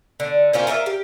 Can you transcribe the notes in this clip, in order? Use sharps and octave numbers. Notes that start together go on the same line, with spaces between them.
D3
C4 C#4 F4 A#4
F4 A#4 C#5 E5
G4